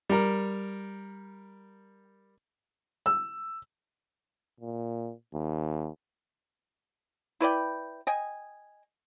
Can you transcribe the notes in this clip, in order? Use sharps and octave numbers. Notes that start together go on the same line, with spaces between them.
G3 A#4
E6
A#2
D#2
E4 B4 D5 G5
D#5 G5 G#5